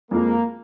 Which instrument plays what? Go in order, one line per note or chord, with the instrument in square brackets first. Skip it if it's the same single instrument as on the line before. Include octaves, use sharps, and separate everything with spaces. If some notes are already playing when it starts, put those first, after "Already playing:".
[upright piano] F2 F3 G#3 [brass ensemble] A#3